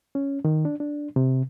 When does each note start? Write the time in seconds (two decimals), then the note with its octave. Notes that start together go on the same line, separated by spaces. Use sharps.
0.15 C#4
0.45 D#3
0.65 D4
0.80 D4
1.16 C3